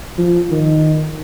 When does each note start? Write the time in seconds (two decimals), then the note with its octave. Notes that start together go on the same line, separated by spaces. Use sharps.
0.18 F3
0.50 D#3